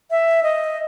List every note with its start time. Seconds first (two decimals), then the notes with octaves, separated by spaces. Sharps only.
0.11 E5
0.43 D#5